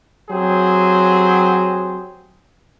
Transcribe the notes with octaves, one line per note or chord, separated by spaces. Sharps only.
F#3 C4 G4 G#4 C5